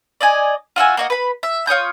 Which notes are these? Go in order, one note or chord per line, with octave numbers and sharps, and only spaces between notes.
D5 D#5 G#5
F4 F#4 E5 G#5
A#3 F#4 D#5
B4 B5
E5
F4 C#5 D#6 G6